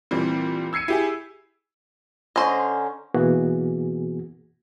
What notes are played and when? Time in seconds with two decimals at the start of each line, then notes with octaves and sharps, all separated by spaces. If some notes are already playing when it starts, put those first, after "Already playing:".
0.11 A#2 E3 G3 C4
0.73 E6 G#6 C7 C#7 D#7
0.88 E4 G4 G#4
2.36 D3 C#4 C5 D#5 A#5
3.14 B2 E3 A#3 B3 F#4 G#4